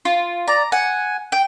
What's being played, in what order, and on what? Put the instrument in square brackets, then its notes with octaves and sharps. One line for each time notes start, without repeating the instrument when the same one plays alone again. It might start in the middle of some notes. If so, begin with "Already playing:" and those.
[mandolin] F4
[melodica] D5 [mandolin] A#5
[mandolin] F#5 [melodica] G#5
[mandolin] G5